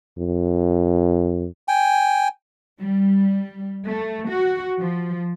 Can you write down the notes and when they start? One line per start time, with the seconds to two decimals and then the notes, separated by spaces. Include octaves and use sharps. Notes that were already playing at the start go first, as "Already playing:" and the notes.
0.18 F2
1.68 G5 G#5
2.80 G3
3.86 A3
4.29 F#4
4.79 F3